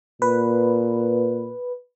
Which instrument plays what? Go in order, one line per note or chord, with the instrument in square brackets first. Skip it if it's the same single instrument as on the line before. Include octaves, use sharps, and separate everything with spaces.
[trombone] A#2 [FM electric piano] B4